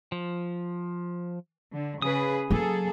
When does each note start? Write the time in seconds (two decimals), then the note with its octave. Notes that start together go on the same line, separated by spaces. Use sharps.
0.12 F3
1.73 D3
2.02 C#3 G#4 B4 D#6
2.51 F#3 A#3 G#4 A4